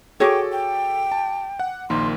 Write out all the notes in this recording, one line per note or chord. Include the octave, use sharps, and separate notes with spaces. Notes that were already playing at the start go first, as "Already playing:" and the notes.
F#4 G#4 A4 C#5 G5 D6
G5
A5
F#5
A#1 D#3 A#3 C6